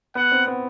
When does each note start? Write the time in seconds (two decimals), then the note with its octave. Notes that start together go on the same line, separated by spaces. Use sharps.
0.15 B3 F#5
0.32 C4
0.47 B3